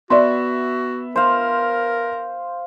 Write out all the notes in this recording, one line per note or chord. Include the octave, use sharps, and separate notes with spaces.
B3 F#4 D5 E5 C6
A#4 C5 F5